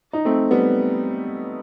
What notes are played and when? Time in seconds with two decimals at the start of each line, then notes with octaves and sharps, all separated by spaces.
0.13 D#4
0.25 A3 C4
0.51 G3 B3